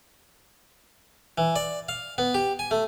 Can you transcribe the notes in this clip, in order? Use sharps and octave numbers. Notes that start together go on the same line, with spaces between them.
E3
D5
F5
B3
G4
G#5
A3